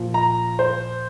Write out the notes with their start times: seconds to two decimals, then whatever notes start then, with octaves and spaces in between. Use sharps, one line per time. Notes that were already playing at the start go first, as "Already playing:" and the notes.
Already playing: A#2 F3
0.14 A#5
0.59 C5